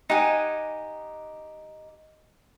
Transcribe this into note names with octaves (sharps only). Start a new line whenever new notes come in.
D#4 G4 F#5 G#5